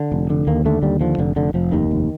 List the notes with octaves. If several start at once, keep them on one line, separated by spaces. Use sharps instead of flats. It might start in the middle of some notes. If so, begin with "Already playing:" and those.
Already playing: D3
F1
D3
D#2 A#3
D3 A3
D#2 G3
D3 F3
F1 D3
F1 D3
F1 F3
D#2 D#3
F1